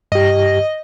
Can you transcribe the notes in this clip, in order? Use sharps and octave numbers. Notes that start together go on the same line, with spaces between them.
G2 G4 D#5